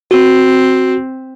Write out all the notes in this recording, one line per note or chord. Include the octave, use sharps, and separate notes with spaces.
C4 F#4